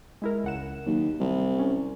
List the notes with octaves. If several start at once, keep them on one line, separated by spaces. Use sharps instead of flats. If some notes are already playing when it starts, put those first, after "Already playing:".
G#3 E4 A#4
C#2 F#5 E7
D#2 F#3
C2
C#4